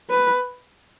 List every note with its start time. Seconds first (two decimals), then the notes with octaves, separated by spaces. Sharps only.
0.10 B4